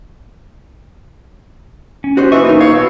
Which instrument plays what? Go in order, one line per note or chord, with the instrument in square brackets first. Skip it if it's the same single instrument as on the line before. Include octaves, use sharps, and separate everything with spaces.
[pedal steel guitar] C#4
[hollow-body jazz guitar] F#4 C5 C#5
[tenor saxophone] E3 [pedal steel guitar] A#3 C#6 [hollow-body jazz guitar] D#5
[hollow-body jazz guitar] B1 D#4 F4 [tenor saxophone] E3
[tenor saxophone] C#5 [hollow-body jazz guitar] F5
[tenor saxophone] B2 [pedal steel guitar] E6